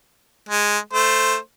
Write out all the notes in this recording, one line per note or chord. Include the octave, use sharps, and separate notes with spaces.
G#3
A3 C5